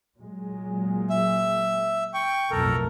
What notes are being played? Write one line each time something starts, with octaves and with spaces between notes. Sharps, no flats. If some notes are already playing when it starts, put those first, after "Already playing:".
A#2 F#3 G#3
E5
G5 C#6
B1 F2 A2 A4 A#4